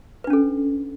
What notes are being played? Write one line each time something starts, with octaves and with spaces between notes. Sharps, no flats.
C#4 D4 A4 B4